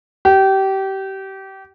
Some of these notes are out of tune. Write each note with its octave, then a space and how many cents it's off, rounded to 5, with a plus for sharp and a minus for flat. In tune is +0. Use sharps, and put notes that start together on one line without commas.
G4 -25